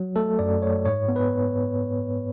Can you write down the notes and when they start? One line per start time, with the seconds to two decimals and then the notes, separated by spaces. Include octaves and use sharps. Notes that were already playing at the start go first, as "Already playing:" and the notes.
Already playing: F#3
0.16 A3 A4
0.39 F#2 D5
0.62 A3 C#5
0.85 G#2 C#5
1.08 B3
1.16 B4